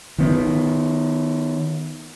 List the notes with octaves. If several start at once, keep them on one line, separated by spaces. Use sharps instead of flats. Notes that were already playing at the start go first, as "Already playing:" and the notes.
D#3 B3